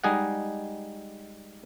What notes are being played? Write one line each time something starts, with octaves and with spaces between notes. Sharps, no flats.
G3 G#3 D#4 G#4 D#5 F#5